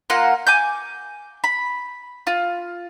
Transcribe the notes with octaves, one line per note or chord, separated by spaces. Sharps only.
A#3 F4 F#5
G#5 D6 G6
B5
F4